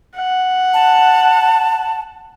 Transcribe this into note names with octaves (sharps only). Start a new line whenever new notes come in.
F#5
A5